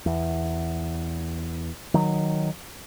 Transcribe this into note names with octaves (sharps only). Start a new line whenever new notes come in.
E2
D#3 F#3